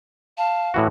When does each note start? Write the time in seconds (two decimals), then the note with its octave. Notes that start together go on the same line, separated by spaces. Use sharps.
0.38 F5 A5
0.74 A2 E3 F#4